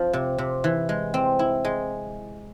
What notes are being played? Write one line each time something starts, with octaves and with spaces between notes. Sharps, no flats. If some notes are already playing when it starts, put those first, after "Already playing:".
Already playing: F2 F3
C3
C3
E3
G#3
C4
E4
G#3